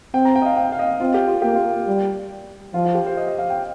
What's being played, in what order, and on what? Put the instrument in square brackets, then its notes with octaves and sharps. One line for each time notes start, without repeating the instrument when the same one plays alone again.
[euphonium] C4 [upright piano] G5
[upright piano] A#5
G5
D#5
F5
G5
F5
D#5
[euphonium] C4 [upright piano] F4
[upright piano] G4
F4
[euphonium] A#3 [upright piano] G4
[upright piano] F4
[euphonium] G3
[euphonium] F3 [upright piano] F4
[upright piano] F4
G4
C5
D#5
D#5
F5
G5